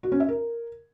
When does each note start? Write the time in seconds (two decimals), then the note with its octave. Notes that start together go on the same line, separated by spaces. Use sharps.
0.03 F#4
0.12 C#4
0.20 E5
0.28 A#4